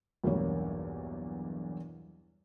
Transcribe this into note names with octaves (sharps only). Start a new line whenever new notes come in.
B1 E2 G2 A#3 E4 C#5